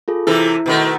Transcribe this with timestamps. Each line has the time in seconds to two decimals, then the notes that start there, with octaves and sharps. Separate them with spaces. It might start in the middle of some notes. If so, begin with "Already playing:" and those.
0.08 F4 G#4 A4
0.27 C3 E3 E4 A4
0.66 B2 D#3 A3